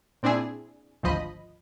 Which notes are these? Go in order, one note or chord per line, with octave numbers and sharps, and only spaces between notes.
A#2 C4 D4 E4 G#4
G#1 D2 F3 D#5 B5